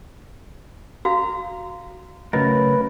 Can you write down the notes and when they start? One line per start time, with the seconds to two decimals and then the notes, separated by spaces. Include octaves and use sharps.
1.05 F#4 F5 A#5
2.33 C#3 F#3 A3 A#4 B4 D#5